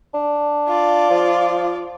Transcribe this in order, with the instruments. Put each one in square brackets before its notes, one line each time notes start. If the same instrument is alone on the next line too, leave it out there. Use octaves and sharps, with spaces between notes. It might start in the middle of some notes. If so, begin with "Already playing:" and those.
[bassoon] D4
[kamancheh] F4 D5
[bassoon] F3